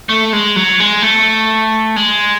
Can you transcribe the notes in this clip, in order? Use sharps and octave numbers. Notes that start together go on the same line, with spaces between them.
A3
G#3
F#3
G#3
A3
G#3